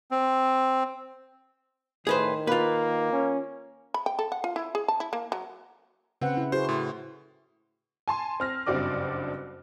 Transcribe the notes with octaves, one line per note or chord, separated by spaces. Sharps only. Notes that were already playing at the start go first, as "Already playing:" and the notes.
C4
A2 D#3 G#4 B4 C5
A#3 F4 B4
C#4
B5
G5
A4
F#5
F4
E4
G#4
A5
E4
A#3
F#3
C#3 C4 B4 F#5
E4
E4 F#4 G#4 C5
A2 C6
G#5 A5 C6
C4 F6 A#6
F#1 G2 C4 F#4 D5 D6